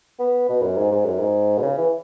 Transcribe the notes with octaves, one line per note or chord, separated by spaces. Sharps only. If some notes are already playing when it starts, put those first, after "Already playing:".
B3
B2
F#2
G#2
G#2
F#2
G#2
B2
C#3
E3